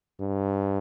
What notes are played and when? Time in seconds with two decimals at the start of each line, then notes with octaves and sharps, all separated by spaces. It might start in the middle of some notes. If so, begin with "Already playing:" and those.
0.20 G2